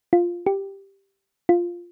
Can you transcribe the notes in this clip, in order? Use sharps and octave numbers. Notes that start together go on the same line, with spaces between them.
F4
G4
F4